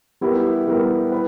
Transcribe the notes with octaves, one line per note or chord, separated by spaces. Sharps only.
G3 B3 E4 G4 A#4
G3 B3 E4 G4 A#4
B4